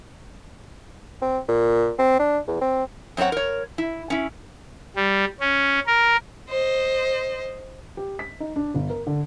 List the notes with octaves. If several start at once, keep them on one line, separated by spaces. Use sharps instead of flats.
C4
A#2
C4
D4
E2
C4
F#2 C4 C#4 C#5 F#5
A#4 C#5
E4
C#4 E4
G3
C#4
A#4
C5 D#5
G4
B6
D#4
D4
G1
A#4
D3